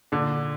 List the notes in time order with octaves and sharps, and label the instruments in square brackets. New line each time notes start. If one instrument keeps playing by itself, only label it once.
[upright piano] A#2 D3 D4